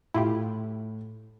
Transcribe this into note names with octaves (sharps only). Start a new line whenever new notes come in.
A2 E4 F4 G4